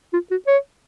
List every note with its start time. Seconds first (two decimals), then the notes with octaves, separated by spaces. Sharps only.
0.13 F4
0.31 F#4
0.47 C#5